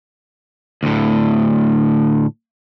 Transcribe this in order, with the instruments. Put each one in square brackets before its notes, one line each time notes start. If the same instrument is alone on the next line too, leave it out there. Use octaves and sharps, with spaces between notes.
[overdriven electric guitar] D2 A2